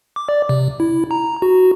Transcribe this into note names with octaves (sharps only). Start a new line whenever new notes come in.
D6
D5
C3
E4
A#5
F#4